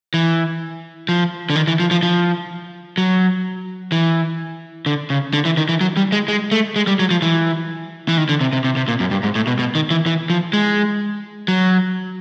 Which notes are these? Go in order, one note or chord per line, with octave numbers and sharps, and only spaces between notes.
E3
F3
D3
D#3
E3
F3
F3
F3
F#3
E3
D3
C#3
D3
E3
D#3
E3
F#3
G3
G#3
G#3
A3
G#3
G3
F#3
F3
E3
E3
D#3
D3
C3
C3
C3
C3
A#2
F#2
G2
G#2
A2
B2
B2
D#3
E3
E3
F3
G#3
F#3